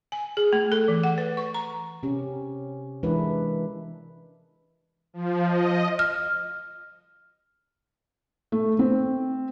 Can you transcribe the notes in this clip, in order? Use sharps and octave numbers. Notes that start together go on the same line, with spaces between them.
G#5
G#4
A3
A4
E3
F#5
B4
C#6
A#5
C3 C#4 G4
E3 G#3 D4 E4 A#4 B4
F3
D#5
F6
A3
C4